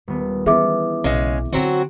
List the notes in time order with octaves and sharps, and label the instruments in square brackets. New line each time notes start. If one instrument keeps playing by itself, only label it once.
[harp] D#1 B3
[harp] E3 B3 C#4 [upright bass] G3 [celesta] G#4 E5 D6
[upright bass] B1 [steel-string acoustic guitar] C#3 G#3
[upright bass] D3 E4 [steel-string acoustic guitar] F#3 C4 F#4